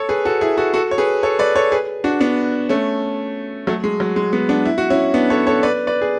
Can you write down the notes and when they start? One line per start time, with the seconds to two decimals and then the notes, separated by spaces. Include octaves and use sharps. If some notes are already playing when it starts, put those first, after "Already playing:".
Already playing: A4 C#5
0.09 G#4 B4
0.25 F#4 A4
0.41 E4 G#4
0.57 F#4 A4
0.74 F#4 A4
0.91 C#5
0.98 G#4 B4
1.23 A4 C#5
1.39 B4 D5
1.55 A4 C#5
1.72 G#4 B4
2.04 D4 F#4
2.21 B3 D4
2.69 A3 C#4
3.67 F#3 A3
3.84 G#3
4.00 F#3
4.16 G#3
4.33 G#3 B3
4.49 B3 D4
4.65 E4
4.78 F#4
4.90 C#4 E4
5.14 B3 D4
5.30 A4 C#5
5.47 A4 C#5
5.63 B4 D5
5.87 B4 D5
6.02 G#4